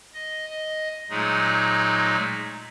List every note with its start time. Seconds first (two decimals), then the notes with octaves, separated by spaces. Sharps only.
0.14 D#5
0.50 D#5
1.10 A#2 F#3 G#3 A3 D#4 G#4